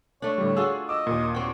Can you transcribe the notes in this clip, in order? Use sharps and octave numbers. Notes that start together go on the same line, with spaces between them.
A3 D4 C#5
A2 D3 G3
D4 F4 F#4 G#4 E6
D#5 D6 E6
D#2 A#2
C4 F#4 G5